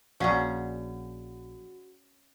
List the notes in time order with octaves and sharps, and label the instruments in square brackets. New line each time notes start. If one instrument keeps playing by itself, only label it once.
[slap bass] A#1 [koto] C#4 G#4 A#5 [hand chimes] F#4 [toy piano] D5 F5 F#5